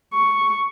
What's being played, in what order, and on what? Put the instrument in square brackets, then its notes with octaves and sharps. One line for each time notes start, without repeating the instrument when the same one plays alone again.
[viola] C#6